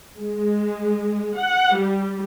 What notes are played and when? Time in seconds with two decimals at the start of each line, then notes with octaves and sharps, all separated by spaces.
0.19 G#3
1.38 F#5
1.76 G3